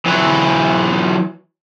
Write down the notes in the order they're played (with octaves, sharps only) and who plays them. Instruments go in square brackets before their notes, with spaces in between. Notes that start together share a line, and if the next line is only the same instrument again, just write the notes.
[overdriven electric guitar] E3 F#3